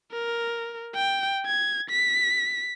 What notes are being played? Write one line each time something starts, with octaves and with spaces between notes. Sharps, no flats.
A#4
G5
G#6
B6